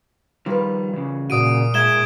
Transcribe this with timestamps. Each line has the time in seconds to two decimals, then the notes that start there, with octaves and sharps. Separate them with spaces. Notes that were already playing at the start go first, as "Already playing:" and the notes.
0.46 D#3 F3 G3 F4 B4
0.93 C#3 E3
1.30 A#2 F#4 D5 D#6 D7 D#7
1.74 G#2 G#4 E5 G#6 E7 G7